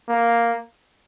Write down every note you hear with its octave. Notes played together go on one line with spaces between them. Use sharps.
A#3